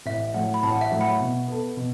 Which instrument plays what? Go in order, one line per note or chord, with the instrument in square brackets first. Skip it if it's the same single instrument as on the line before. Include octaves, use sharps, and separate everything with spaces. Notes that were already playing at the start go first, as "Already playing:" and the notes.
[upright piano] A1 [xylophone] E5
[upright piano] A2 F#3 [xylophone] F#5
[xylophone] B5
[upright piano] A1 [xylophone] A5
[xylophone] F#5
E5
[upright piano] A2 F#3
[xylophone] F#5 B5
[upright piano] B2
B3 A4
B2